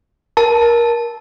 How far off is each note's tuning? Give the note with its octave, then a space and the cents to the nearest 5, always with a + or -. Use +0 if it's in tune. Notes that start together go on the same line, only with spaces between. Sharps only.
A#4 +20 A5 +0